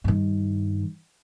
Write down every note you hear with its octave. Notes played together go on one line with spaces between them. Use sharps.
G2 D#3